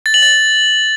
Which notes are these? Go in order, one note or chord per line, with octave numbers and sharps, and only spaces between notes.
A6
F#7
A6